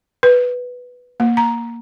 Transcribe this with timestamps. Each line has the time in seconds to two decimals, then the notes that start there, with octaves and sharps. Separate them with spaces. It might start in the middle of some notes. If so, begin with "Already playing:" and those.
0.23 B4
1.20 A#3
1.37 A#5